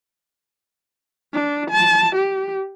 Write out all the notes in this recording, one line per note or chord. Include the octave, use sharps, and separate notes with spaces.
D4
A5
G4